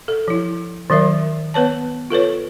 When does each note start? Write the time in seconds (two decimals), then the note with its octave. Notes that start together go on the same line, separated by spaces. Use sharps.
0.08 A4
0.28 F3 E4
0.90 D#3 F#3 A#4 E5
1.54 B3 B4 C#5 A5
2.10 F4 A4 B4 C#5